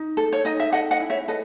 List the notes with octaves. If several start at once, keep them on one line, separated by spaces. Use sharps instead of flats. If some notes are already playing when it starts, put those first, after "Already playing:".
Already playing: D#4
A4
C#5
D#4 D#5
E5
A4 D#5 F#5
D#5 F#5
E4
C#5 E5
A4 B4 D#5